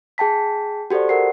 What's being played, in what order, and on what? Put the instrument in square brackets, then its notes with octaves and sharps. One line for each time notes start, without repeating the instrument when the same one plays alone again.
[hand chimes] G#4 G5 A5 B6
F#4 G4 A4 C5 D5
A#4 F#5 C7